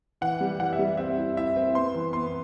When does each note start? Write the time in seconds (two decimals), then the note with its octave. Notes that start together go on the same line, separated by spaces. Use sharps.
0.21 E3 F#5
0.41 G3
0.59 E3 F#5
0.73 E5
0.79 G3
0.97 C4 E5
1.18 E4
1.37 E4 E5
1.56 C4
1.75 B3 C6
1.94 E3
2.13 B3 C6